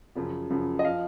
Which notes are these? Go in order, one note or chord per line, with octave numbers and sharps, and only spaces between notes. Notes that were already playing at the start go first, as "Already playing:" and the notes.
F#2 C#3 F3
F#2 C#3 F3
D#5
F3 F5